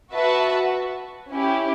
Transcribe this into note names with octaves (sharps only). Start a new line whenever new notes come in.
F#4 B4 E5 A5
C#4 E4 G4